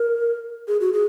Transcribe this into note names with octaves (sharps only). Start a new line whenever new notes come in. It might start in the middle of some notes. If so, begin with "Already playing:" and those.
Already playing: A#4
G#4
F#4
G#4